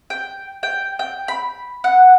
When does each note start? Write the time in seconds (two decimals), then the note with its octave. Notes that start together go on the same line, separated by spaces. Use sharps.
0.10 G5
0.63 G5
0.99 G5
1.28 B5
1.84 F#5